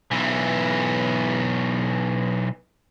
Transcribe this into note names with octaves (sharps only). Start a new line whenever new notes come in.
B1 E3